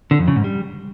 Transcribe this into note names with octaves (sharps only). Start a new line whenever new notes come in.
D3
F2
C#3
G#2
G3